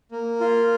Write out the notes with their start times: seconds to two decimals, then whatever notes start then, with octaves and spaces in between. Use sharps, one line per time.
0.11 A#3
0.40 F4